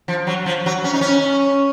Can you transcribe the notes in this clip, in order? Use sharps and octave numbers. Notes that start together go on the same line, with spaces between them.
F3
F#3
F3
F#3
C#4
D#4
C#4